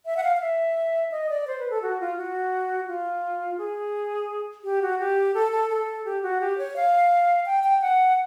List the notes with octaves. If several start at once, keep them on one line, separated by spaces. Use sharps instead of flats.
E5
F#5
F5
F5
E5
D#5
D5
C5
B4
A4
F#4
F4
F#4
F4
G#4
G4
F#4
G4
A4
A4
A4
G4
F#4
G4
C#5
F5
G5
G5
F#5